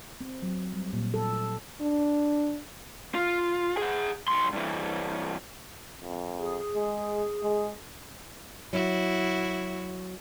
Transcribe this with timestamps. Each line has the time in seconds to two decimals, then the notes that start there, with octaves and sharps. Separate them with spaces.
0.21 C4
0.42 F#3
0.73 G3
0.93 A#2
1.14 A4
1.81 D4
3.15 F4
3.77 G#4 F#5
4.28 B1 C6
4.53 G2 E3
6.03 F2
6.39 G#4
6.75 G#3
7.43 G#3
8.73 F#3 E4 F#4